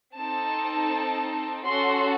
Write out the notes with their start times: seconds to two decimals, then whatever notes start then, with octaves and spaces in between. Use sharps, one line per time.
0.16 C4 D#4 A4 A5
1.65 C#4 F#4 A4 C6